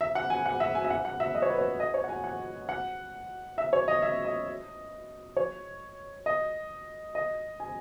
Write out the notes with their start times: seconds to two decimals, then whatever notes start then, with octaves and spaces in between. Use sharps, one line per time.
0.01 E5
0.15 F#5
0.30 G#5
0.46 F#5
0.60 E5
0.75 G#5
0.85 E5
0.90 F#5
1.05 F#5
1.20 E5
1.35 D#5
1.42 C#5
1.50 B4
1.58 C#5
1.80 D#5
1.94 C#5
2.04 F#5
2.09 G#5
2.24 F#5
2.69 F#5
3.58 E5
3.73 C#5
3.88 D#5
4.02 E5
4.25 D#5
5.37 C#5
6.26 D#5
7.15 D#5
7.60 G#5